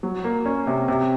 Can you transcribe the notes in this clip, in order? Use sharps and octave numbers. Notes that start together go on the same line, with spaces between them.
F#3
A#3
C#4
C3
C3